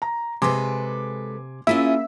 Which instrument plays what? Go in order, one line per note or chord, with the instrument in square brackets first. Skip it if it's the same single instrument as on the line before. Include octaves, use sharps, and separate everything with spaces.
[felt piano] A#5
[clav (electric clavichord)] C3 [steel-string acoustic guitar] G#3 A4 B4 [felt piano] G#5 C6 D6
[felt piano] A#3 [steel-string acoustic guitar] C#4 F4 G#4 [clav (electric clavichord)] E4 [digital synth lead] E5